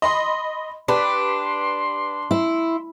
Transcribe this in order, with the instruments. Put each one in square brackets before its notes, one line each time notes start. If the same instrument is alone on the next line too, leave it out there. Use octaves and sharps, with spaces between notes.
[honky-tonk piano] D#5 B5 C6
[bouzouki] D4 [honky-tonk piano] G4 B4 [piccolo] C6
[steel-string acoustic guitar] E4